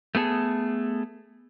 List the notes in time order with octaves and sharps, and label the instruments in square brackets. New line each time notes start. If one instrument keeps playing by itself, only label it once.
[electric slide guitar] A3 B3 G#4 A4